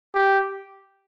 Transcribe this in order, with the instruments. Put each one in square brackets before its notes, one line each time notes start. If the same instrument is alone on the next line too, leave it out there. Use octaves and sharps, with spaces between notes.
[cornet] G4